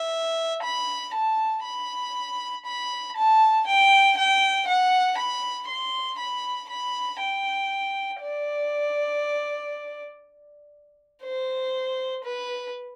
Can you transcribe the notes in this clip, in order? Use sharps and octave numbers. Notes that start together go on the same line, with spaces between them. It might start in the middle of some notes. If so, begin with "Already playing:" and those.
Already playing: E5
B5
A5
B5
B5
A5
G5
G5
F#5
B5
C6
B5
B5
G5
D5
C5
B4